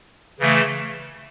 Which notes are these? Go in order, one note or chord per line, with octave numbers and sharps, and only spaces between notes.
C#3 E3 A3